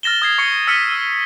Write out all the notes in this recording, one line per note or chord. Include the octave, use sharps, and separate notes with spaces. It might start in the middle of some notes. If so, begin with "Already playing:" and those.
F6 A6 A#6 E7 G7
D#6 G#6 C7
C#6 C7 C#7 G7
E6 F6 B6 C#7 D#7
E6